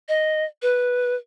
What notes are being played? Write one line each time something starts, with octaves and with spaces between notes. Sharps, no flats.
D#5
B4